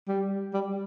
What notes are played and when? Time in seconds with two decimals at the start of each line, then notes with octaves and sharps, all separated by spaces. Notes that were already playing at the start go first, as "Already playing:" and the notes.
0.08 G3
0.53 G3